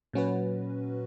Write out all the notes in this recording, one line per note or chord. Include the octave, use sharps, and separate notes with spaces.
A#2 F#3 C#4 F#4 B4